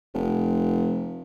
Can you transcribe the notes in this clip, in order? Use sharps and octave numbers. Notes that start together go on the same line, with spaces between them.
F1